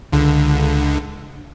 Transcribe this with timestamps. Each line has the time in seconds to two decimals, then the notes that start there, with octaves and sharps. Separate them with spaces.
0.12 C#2 D3